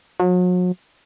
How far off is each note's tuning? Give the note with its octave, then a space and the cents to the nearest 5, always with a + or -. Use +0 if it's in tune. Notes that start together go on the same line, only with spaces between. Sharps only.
F#3 -40